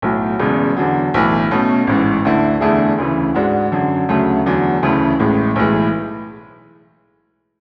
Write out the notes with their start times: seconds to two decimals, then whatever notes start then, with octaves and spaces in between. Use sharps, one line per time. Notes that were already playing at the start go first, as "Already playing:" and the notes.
0.02 B1 A2 F#3
0.39 E1 E2 C#3 G#3
0.76 E2 D3 F#3
1.14 B1 A2 E3
1.51 B2 A3 C#4
1.87 A1 G#2 E3
2.25 D2 D3 A3 E4
2.61 E2 D3 A3 E4 G#4
2.98 D2 C#3 E3
3.34 G#2 G#3 D4 F#4
3.72 F#2 D3 F#3
4.09 D2 C#3 F#3 A3
4.46 E2 D3 F#3
4.83 D2 C#3 E3 A3
5.20 A1 A2 G#3
5.56 B1 A2 E3 G#3